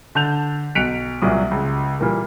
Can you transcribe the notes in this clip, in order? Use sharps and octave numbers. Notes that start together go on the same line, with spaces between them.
D3 A5 G6 F7
B1 F#6 B6 C#7 D7 F7
C2 A#2 F#3 D#6
C#2
A#2 E3 G3 A#3